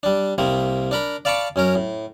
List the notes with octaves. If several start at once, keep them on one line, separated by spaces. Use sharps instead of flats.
G3 D4
C2 C3 A#3 C4
D4 A#4 B5
D5 F5 A5 B5 C#6 D6
F#2 C#4 A#4
A2